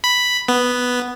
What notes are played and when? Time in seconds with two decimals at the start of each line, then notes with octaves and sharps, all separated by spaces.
0.04 B5
0.48 B3